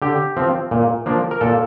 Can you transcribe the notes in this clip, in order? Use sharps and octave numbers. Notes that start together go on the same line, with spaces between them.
D3 G4
F3 C4
A#2
F3 A#3 D4
A#4
A#2 A4